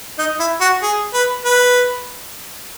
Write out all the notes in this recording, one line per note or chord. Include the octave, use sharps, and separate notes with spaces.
D#4
E4
F#4
G#4
B4
B4